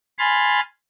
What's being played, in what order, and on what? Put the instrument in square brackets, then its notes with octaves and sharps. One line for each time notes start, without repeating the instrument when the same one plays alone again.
[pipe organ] G#5 B5 C6 F6 A6